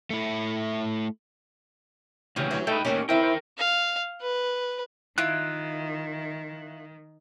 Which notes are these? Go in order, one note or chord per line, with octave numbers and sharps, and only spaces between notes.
A3 E4
D2 C#3 E3 C#4 G4
E3 F#3
A3 D#4 B4 G5
A2 A#3 C#4 D#4 G4
E2 C4 E4 A#4 E5 G5
C5
F5
B4
D#3 E4 F4 F#6